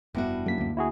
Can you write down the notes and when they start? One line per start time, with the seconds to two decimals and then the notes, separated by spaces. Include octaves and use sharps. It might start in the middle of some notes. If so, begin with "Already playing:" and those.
0.15 F1 G2 B3 E4 F#4
0.46 F#2 G3 A#3 B6
0.58 D2 A#3
0.77 E4 F#4 G#4